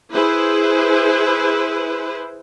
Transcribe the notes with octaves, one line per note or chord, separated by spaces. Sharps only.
E4 G#4 B4 C5